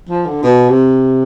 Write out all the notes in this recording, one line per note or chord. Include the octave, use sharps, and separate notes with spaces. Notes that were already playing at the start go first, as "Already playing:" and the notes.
F3
D3
B2
C3